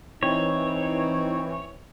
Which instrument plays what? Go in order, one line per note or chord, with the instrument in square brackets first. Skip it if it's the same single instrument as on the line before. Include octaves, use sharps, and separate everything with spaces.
[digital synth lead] E3 [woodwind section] C4 [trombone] D#4 [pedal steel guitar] C#5